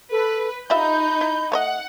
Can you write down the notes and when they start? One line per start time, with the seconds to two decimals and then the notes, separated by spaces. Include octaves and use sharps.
0.11 A4 B4
0.70 D#4 F4 G4 E5 B5 G6
1.21 E4
1.52 A3 C#5 D#5 F#5